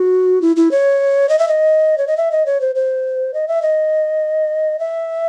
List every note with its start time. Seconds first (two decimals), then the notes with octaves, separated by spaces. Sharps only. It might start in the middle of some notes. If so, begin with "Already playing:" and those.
Already playing: F#4
0.42 E4
0.56 E4
0.71 C#5
1.29 D#5
1.39 E5
1.48 D#5
1.98 C#5
2.07 D#5
2.17 E5
2.32 D#5
2.46 C#5
2.61 C5
2.75 C5
3.34 D#5
3.48 E5
3.62 D#5
4.79 E5